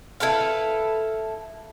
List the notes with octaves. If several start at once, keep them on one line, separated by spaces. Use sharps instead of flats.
E4 A4 B4 F5